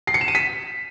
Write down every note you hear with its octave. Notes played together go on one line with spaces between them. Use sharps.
C7
C#7
E7
D#7
B6